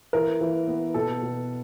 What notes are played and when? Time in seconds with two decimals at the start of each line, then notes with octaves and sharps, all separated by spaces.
0.13 E3 A#4
0.41 E3
0.68 B3
0.94 B2 A4
1.22 B2